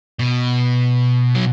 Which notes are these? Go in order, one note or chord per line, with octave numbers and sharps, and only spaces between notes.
B2
F#3